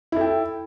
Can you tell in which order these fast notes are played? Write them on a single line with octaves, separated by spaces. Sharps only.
E4 A4 G5